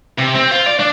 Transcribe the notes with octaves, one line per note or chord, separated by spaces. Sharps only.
C3
C4
F4
D5
D4